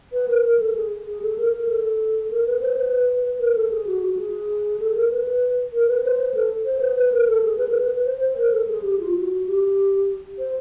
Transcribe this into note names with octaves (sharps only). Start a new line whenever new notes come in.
B4
A#4
A#4
A4
G#4
G#4
A4
A#4
A#4
A4
A#4
B4
C5
B4
B4
A#4
A4
G#4
F#4
F#4
G#4
A4
A#4
B4
A#4
B4
C5
B4
A4
C5
B4
B4
A#4
A4
G#4
B4
A#4
B4
C5
C5
A#4
A4
G#4
G4
F4
F#4
G4
C5